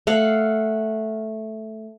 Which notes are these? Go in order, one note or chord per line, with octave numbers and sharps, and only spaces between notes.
A3 F5 F#5